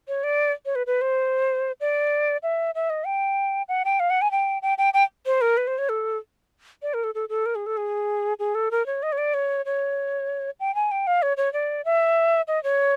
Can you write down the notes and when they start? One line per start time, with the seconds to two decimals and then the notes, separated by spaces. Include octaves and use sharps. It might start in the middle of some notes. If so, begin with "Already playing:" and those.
0.08 C#5
0.24 D5
0.66 C#5
0.75 B4
0.87 B4
1.01 C5
1.81 D5
2.43 E5
2.75 E5
2.90 D#5
3.06 G5
3.69 F#5
3.85 G5
4.00 F5
4.10 F#5
4.22 G#5
4.31 G5
4.62 G5
4.78 G5
4.94 G5
5.26 C5
5.41 A#4
5.57 B4
5.67 C5
5.78 C#5
5.89 A4
6.82 D5
6.94 A#4
7.04 A4
7.15 A4
7.29 A4
7.46 A#4
7.55 G#4
7.66 A4
7.77 G#4
8.39 G#4
8.55 A4
8.71 A#4
8.86 C#5
9.03 D#5
9.12 C#5
9.18 D5
9.34 C#5
9.66 C#5
10.60 G5
10.75 G#5
10.91 G5
11.07 F5
11.22 C#5
11.37 C#5
11.53 D5
11.85 E5
12.48 D#5
12.64 C#5